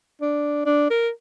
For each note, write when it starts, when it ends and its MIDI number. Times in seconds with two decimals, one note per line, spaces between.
0.21 0.63 62
0.66 0.87 62
0.90 1.09 70